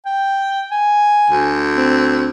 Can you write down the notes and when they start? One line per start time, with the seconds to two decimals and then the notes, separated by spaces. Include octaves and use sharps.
0.06 G5
0.71 G#5
1.30 D2
1.76 C4